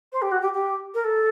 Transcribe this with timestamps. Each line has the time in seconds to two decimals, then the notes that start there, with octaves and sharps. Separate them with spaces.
0.12 C5
0.21 G4
0.31 F#4
0.41 G4
0.53 G4
0.94 A#4
1.04 A4